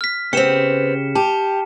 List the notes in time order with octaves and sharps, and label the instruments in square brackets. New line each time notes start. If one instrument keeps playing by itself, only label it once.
[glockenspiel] F6 B6
[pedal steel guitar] C#3 G4 G5 [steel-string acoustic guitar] B3 C4 [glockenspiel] C#7 E7
[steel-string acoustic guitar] G4 [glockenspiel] A5